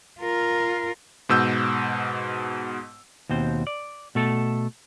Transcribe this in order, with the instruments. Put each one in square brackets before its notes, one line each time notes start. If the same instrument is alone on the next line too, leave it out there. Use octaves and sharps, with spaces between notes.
[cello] F4 A#4
[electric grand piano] G#2 B2 E6 G6
[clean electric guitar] D#2 B2 C4 C5
D5
B2 A3 A4